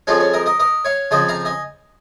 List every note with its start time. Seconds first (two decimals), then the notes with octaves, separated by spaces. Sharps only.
0.07 F2 F3 G#3 C#4 F4
0.20 C#4
0.33 A#4 D#5
0.46 A#4 D#5
0.59 A#4 D#5
0.85 C#5 F5
1.11 F2 C#3 F3 D#5 G#5
1.29 F5 A#5
1.45 D#5 G#5